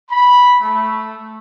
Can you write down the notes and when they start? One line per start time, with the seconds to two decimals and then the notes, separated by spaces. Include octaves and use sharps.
0.10 B5
0.60 A3